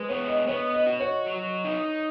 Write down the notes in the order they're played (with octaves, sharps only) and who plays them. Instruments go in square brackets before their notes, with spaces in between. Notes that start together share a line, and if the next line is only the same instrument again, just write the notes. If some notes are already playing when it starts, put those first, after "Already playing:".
Already playing: [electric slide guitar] G#3 [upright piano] B4
[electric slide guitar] B3 [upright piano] C#5
[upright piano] D#5
[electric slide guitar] B3 [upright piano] C#5
[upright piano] D#5
[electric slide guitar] F#4
[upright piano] C#5
[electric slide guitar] F#3
D#4